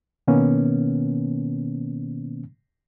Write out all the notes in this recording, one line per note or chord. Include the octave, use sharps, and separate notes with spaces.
B2 D#3 A#3 B3 C#4